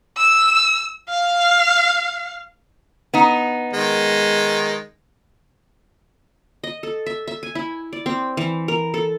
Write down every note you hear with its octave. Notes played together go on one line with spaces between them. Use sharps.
E6
F5
B3 D#4
D#3 G#3
D#5
A4
E5
E5
G#5
E4
D5
C4
E3
A#4
A4